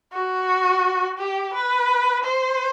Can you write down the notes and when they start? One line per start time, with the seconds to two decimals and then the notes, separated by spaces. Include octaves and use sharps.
0.13 F#4
1.18 G4
1.54 B4
2.24 C5